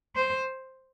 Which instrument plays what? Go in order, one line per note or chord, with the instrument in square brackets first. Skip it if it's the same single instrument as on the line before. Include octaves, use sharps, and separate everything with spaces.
[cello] C5